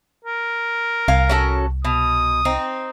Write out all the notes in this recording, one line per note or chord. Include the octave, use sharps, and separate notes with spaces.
A#4
C2 F5 G#5
C#4 F#4 A4
B2 D#6
C4 D#4